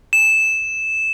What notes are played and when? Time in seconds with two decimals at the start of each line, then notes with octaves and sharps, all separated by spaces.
0.13 E7